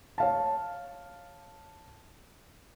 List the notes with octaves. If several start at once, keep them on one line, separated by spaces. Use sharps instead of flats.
C#5 F5 A5